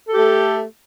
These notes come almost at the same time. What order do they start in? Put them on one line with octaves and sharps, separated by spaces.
A4 G4 A3